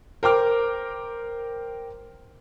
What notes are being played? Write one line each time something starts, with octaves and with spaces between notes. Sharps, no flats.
A#4 C5 G5 A#5 D6 F6